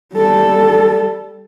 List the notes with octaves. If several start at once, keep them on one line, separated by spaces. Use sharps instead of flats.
G3 A4